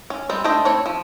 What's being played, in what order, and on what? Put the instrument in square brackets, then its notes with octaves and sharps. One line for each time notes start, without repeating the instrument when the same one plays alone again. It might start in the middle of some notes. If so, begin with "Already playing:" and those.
[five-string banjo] C#4
G3 G#3 C4
A3 D4 G4 C5 D#5
A3 C4 E4 C#5
F3